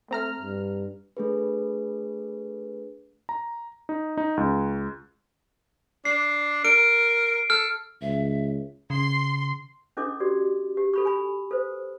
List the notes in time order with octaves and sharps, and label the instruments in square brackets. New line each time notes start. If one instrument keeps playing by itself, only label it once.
[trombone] A3 [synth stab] C4 A#5 F6
[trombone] G2
[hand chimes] A3 D4 G#4 A4 B4
[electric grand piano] A#5
D#4
D#4
C#2
[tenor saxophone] D4 [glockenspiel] C7
[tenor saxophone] A#4 [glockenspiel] D7
[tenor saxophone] A4 [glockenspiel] F6
[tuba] C#2 [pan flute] E5
[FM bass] C#3 [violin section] C6
[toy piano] C#4 D4 E4 A4 D#5 D6
F#4 G4 D5
G4
A4 B5 C#6
G#5 B5
A4 B4 C5